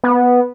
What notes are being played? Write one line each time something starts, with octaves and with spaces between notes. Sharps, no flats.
B3